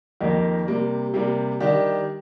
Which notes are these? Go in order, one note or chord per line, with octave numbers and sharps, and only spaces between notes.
F2 D#3 A#3 D#4 G4
C3 G3 A#3
C3 G3 A#3
D#3 G3 D4 G4